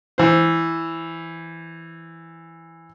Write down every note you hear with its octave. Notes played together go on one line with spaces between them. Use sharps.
E3 C5